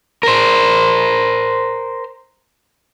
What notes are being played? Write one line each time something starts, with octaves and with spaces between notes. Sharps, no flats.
A#4 C5